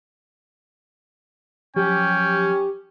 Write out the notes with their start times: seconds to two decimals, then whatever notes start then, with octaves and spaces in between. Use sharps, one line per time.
1.76 F3 F#3 C#4 G4 G5